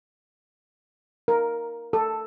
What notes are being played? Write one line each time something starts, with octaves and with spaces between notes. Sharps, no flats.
A#4
A4